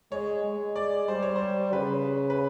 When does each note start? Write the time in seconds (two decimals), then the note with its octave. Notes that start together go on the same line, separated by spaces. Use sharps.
0.11 G#3 C#5
0.44 G#3
0.76 D5
1.08 G3 C5
1.23 C#5
1.36 C5
1.73 C#3 B4
2.30 B4